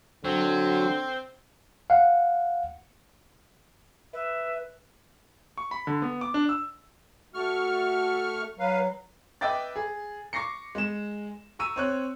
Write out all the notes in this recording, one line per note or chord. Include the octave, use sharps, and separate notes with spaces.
D3 F#3 C4
F5 F#5
B4 E5
C#6
B5
D3
B3
D6
D4
E6
A3 F#4 C#6 F6
F#3 B4 F5
B4 D#5 E5 G5 D6 A6
G#4
C#6 D6 A#6 C7 C#7
G#3 E7
A#5 C#6 E6 D#7
C4 C#5 F#6